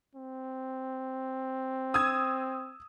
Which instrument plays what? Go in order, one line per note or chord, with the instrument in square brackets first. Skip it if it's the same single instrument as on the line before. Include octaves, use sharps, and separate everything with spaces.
[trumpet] C4
[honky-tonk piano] D#6 E6 G#6